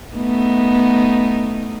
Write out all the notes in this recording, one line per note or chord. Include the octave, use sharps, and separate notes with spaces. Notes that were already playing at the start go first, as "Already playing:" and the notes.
A3 B3 D#4